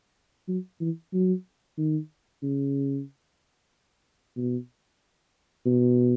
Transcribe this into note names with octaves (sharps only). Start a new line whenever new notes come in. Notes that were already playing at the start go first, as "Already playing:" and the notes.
F#3
E3
F#3
D#3
C#3
B2
B2